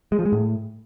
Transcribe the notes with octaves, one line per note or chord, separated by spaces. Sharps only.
G#3
F3
G#3
A2